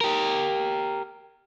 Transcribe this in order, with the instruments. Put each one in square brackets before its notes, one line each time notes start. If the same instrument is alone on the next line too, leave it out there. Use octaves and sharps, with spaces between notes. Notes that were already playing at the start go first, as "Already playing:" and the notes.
[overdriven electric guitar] G4 A#4